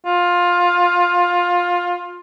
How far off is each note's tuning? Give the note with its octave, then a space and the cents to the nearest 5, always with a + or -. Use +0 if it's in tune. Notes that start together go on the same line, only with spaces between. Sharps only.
F4 +15